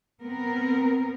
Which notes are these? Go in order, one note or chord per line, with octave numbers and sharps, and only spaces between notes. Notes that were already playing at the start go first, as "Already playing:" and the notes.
B3 C4 A#4